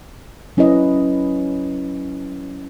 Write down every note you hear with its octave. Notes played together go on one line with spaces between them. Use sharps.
F#3 C#4 E4 B4 D#5